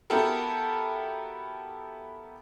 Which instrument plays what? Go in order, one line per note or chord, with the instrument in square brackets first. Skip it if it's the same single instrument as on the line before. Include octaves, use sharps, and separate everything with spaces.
[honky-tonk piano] B3 E4 F#4 G4 A4 A#4